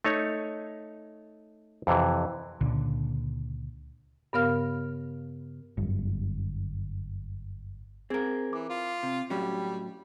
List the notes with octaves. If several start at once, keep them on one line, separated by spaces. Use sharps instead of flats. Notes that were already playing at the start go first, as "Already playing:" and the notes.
A3 D#4 C#5
F2 C3 E3
C#2 A#2 D3
G2 C#3 B3 A#4 F5 F6
G1 F#2
C4 G#4 A#4 G#6
E3 D6
F4
C3
A2 F#3 G3 C#4